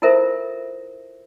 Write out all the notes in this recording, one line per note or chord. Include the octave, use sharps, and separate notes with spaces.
E4 F4 A4 A#4 C5 E5